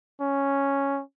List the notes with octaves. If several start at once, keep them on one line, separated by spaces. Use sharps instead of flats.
C#4